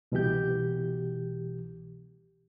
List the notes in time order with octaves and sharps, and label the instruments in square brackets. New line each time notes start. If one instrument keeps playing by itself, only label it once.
[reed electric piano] C2 B2 E3 G4 G6